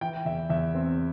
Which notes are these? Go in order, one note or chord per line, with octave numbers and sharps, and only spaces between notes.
E3 G5
E2 E5
E2 E5
C4